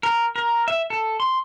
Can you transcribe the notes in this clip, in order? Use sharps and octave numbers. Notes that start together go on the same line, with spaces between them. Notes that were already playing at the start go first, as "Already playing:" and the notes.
A#4
A#4
E5
A4
C6